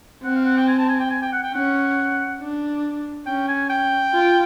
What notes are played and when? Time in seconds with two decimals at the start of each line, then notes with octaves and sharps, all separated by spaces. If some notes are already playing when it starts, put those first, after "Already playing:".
0.24 C4 F#5
0.36 F5
0.45 F#5
0.57 G5
0.68 G#5
0.78 A5
0.89 G#5
1.00 G5
1.10 G#5
1.22 G5
1.32 F#5
1.43 G5
1.53 C#4 F#5
2.40 D4
3.26 C#4 G5
3.48 G#5
3.70 G5
4.13 F4